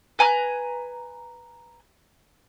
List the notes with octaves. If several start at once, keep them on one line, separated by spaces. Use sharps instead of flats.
B4 G#5 A#5 F#6